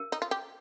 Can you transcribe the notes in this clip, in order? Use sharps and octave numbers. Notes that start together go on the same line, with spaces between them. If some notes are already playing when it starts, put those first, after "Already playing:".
Already playing: A#4
D#4
F4
G4